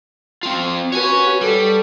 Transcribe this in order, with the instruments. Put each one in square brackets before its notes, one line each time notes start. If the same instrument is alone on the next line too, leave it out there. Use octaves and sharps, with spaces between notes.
[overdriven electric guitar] C4 F4
[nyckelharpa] F#4 B4 [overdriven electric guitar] C#5 G#5
[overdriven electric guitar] G3 [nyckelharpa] A4